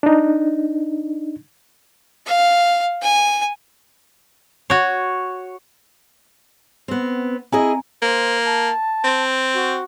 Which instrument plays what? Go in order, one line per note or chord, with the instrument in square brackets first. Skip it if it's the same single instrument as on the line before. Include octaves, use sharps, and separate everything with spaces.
[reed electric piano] D4 D#4
[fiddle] F5
G#5
[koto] F#4 C#5
[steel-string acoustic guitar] B3 C4
[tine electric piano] C4 G#5 A#5 [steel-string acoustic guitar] E4 G#4 D#5
[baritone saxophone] A#3 [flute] C5
[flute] A5
[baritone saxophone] C4
[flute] F#4